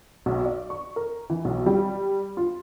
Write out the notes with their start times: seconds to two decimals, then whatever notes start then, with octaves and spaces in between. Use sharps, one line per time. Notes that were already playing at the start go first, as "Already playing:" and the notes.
0.26 B1
0.46 D5
0.70 C#6
0.96 A#4
1.30 E3
1.45 B1
1.66 G3
2.37 F4